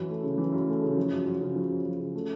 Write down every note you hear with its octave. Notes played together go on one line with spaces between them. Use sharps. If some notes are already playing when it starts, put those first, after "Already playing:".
Already playing: F#2 E3
A3
C#3
E3
F#2
A3
C#3
F3
F#2
F#2
C#3
F3
F#2
F#2
C#3
A3